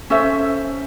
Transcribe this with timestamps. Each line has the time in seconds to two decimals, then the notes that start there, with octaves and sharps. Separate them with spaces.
0.10 C#4 A4 C5 E5